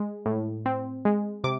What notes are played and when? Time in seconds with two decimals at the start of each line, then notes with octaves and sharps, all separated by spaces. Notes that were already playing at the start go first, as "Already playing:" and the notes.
Already playing: G#3
0.26 A2
0.66 C4
1.05 G#3
1.44 C3 D6